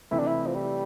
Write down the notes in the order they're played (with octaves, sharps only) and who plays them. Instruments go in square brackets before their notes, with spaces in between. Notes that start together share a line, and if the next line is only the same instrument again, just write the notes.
[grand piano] C3 E3 A3 C4 [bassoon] E4
[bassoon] D4
E4
F3
G3